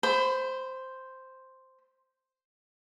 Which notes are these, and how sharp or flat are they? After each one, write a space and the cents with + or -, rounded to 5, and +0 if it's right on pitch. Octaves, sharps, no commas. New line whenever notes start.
C5 +0 B5 +30